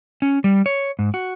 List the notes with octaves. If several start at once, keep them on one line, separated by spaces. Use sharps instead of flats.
C#4
G3
C#5
G#2
F#4